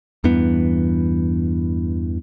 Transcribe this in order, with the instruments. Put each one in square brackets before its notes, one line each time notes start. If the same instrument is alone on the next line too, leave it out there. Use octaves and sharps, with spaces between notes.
[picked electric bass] E2 G2 E3 B3